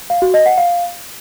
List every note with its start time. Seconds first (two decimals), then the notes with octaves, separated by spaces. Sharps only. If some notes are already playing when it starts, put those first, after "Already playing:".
0.10 F5
0.22 F#4
0.34 D#5
0.46 F#5
0.58 F5